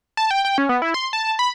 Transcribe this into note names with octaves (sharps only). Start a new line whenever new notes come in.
A5
G5
G5
C#4
B3
E4
C6
A5
B5